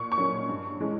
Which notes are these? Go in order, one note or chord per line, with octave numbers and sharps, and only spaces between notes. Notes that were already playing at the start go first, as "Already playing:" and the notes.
Already playing: A#2 C#6
C#6
F#3 A#3 C#4
G2
E3 G#3 C#4